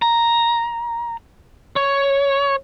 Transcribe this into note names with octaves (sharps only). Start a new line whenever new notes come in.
A#5
C#5